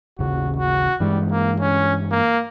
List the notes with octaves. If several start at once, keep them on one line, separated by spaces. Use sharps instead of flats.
A1 D#2 C#3 F#4
F#4
G2 E3 G3 G#3
A#3
C#4
A#3